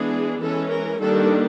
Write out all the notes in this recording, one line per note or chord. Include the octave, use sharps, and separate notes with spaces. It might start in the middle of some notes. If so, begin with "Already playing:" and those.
Already playing: E3 G#3 B3 D4 G#4
E3 G#3 C#4 A4
A#4
D#3 G3 A#3 D4 A4